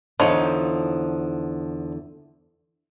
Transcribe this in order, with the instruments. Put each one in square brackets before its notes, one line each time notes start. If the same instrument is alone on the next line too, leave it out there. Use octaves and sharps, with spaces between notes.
[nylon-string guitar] E2 D3 [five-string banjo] F3 D#4 C#5